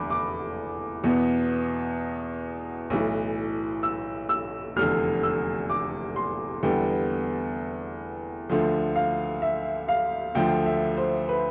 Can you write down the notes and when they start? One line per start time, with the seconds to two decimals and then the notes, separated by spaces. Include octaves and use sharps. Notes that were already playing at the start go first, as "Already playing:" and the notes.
Already playing: F1 E2 D3 B5 D6
0.10 D6
1.04 E2 B2 B3
2.90 B1 A2 E3
3.83 E6
4.29 E6
4.76 F1 E2 D3 F6
5.23 E6
5.70 D6
6.16 C6
6.63 E2 D3 G3 B3 G5
8.49 D2 D3 F3
8.96 F5
9.42 E5
9.88 F5
10.35 D2 D3 F3 G5
10.66 E5
10.98 C5
11.29 B4